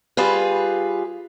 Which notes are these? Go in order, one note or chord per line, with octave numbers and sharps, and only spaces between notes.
G3 F4 G#4 B4